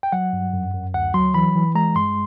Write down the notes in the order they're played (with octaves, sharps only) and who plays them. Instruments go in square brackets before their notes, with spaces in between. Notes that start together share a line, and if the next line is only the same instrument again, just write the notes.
[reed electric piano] G5
F#3 F#5
G2
F#2
F#2
D2 F#5
F#3 C6
E3 B5
E3
G#3 A#5
G2 C6